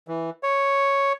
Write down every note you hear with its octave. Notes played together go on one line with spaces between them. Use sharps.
E3
C#5